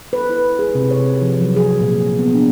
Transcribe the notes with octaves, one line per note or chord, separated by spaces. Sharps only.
B4
E4
G#4
C3
C#5
F3
F#3
G#4
A#2
B3
D4